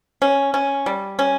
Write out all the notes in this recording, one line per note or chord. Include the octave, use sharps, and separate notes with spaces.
C#4
C#4
G3
C#4